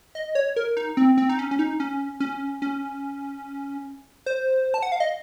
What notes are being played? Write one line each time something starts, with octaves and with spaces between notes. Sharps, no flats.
D#5
C#5
A#4
D#4
C4
C4
D#4
C#4
C#4
D#4
C#4
C#4
C#4
C5
A5
F#5
F5
D#5